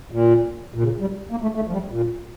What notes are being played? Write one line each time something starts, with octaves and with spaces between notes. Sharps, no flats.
A#2
A#2
C#3
G3
A#3
A3
A3
F3
G3
A#2